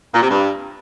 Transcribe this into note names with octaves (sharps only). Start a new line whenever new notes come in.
A#2
C3
G2